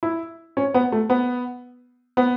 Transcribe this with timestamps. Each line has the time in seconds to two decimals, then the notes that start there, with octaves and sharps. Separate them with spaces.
0.03 E4
0.57 C#4
0.74 B3
0.92 A3
1.10 B3
2.17 B3